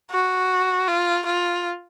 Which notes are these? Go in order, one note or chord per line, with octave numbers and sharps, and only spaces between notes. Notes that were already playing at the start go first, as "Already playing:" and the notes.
F#4
F4
F4